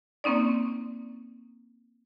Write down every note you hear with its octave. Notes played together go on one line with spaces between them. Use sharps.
A#3 C4 C#4 D#4 D5